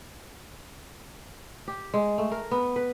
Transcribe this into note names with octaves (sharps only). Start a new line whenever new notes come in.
G4
G#3
A3
A#4
B3
B4